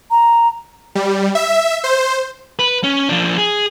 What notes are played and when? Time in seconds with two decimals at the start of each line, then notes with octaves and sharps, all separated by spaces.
0.11 A#5
0.95 G3
1.35 E5
1.84 C5
2.59 B4
2.84 C#4
3.09 F3 D4
3.38 G#4